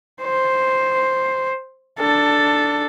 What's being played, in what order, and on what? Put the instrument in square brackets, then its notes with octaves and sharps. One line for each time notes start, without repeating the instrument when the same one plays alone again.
[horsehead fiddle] C5
D4 A4